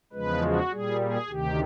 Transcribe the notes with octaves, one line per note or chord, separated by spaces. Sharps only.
E2 C#3 F3 G#3 B4
F#4
A#2 G3 G#4
G#4
D2 C3 D#3 G4